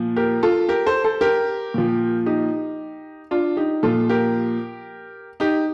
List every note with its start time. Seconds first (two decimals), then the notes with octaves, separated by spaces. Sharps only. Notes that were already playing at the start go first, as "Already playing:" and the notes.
Already playing: A#2 F3
0.16 G4 A#4
0.43 F4 A4
0.69 G4 A#4
0.86 A4 C5
1.04 A4 C5
1.21 G4 A#4
1.74 A#2 F3
2.26 D#4 G4
3.31 D4 F4
3.57 D#4 G4
3.83 A#2 F3 F4 A4
4.09 G4 A#4
5.40 D#4 G4